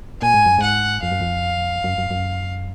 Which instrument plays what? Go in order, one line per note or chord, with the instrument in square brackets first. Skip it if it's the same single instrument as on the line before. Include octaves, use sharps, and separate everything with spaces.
[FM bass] A#2 [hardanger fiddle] G#5
[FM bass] G#2
F#2
[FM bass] G#2 [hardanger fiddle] F#5
[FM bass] F2 [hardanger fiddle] F5
[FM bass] F#2
F2
F#2
F#2
F#2